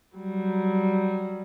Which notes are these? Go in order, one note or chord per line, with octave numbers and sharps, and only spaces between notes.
F#3 G3